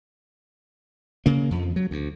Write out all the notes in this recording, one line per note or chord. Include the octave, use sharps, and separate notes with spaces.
C#3 A#3
F2 F3
F#3
D2